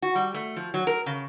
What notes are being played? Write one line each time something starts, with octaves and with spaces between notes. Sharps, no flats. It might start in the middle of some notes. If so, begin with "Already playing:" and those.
F#4
G3
A3
F3
F#3
A#4
C#3